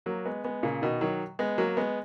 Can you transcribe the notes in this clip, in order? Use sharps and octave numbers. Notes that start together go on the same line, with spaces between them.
F#3 A#3
G#3 B3
G#3 B3
A#2 C#3
B2 D#3
D#3 F#3
G#3 B3
F#3 A#3
G#3 B3